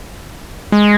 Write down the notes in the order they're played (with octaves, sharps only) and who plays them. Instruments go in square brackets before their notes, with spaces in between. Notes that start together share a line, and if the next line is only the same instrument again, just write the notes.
[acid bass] G#3